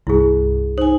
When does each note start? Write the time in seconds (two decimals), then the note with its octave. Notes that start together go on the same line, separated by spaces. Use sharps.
0.07 C2 G2 E4 G#4
0.78 D#4 C5 G#5